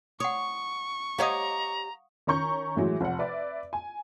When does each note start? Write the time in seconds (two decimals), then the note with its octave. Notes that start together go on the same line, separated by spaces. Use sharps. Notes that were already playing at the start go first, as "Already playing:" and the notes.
0.20 C#5 F#5 C#6 D#6
1.18 G4 C#5 D#5 F5 F#5 A#5 D#6
2.27 D#3 C#4 A#5 C#6 G6
2.76 A2 E3 F#3 G#3
3.01 F1 F#5
3.19 B4 D5 E5
3.73 G#5